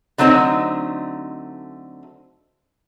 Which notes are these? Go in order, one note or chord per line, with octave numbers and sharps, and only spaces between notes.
D3 F#3 A3 C4 D#4